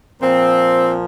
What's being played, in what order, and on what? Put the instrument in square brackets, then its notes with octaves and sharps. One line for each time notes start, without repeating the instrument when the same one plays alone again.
[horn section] A#2 F3 C4